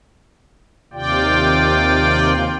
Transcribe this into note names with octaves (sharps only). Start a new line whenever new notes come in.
D#2 C3 F4 D5 G5